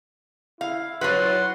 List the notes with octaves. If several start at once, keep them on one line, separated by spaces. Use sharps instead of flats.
E4 F5
F#3 F4 F#4 B4 F#5 C6